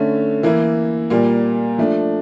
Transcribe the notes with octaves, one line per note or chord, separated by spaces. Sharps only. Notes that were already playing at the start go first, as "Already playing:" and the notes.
Already playing: D3 A3 C#4
E3 A#3 E4
A#2 G3 A#3
F3 A3 D4